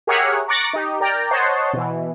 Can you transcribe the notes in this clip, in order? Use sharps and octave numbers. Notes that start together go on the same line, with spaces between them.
G4 G#4 A#4 C#5 E5 F#5
A#5 C#6 D6 F#6 A6 A#6
D#4 G4
A#4 D5 G5 A#5
C5 C#5 D#5 F#5 A5 C6
B2 E3